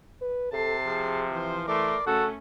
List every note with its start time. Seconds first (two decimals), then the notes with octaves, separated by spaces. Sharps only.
0.21 B4
0.53 C3 A4 A5 C7
0.86 F3 G#4
1.32 E3 C5
1.68 A3 A#4 D5 C6
2.07 C#3 A3 C#4 F#4 A4